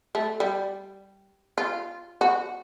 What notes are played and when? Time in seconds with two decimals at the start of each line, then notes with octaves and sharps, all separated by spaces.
0.15 A3
0.40 G3
1.58 F4
2.21 F#4